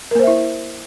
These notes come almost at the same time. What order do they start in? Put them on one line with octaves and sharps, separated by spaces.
A#4 A#3 C5 E5 E4